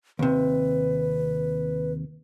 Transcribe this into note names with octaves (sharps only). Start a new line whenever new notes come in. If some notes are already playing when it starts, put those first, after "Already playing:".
D#2 C3 B4